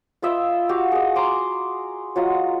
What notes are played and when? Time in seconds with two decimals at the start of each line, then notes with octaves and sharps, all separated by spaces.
0.22 F4 B4 D#5 E5
0.69 F#4 G4 F5
0.92 G#4 D#5
1.15 A#5 C6 D6
2.16 F#3 F4 D#5